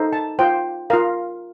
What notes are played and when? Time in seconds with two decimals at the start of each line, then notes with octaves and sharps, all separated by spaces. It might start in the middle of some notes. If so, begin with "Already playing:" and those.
Already playing: D#4 A4 C5
0.13 A5
0.39 F4 C5 G5
0.90 F4 A#4 F5